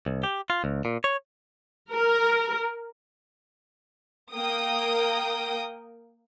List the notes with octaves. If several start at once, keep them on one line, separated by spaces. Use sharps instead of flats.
C2
G4
F4
C#2
A#2
C#5
A#4
A#3 A#4 G5 D#6